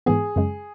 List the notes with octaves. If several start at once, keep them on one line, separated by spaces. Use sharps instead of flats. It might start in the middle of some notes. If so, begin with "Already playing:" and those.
G#2 E3 B3 G#4
F#2 C#3 G#3